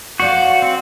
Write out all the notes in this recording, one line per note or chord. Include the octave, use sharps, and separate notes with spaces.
F#4 C5 D5 F5
C4